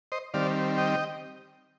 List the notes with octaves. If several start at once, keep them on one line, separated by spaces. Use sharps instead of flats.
C5 D#5
D#3 G3 C4 D5 F5
D#5 G5